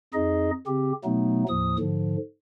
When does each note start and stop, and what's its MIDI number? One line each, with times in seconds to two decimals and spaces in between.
0.14 0.51 41
0.14 0.51 63
0.14 0.51 68
0.14 0.51 75
0.67 0.92 49
0.67 0.92 60
0.67 0.92 67
1.04 1.44 47
1.04 1.44 54
1.04 1.44 57
1.04 1.44 59
1.04 1.44 63
1.49 1.77 39
1.49 1.77 45
1.49 1.77 53
1.49 1.77 87
1.79 2.17 44
1.79 2.17 50
1.79 2.17 53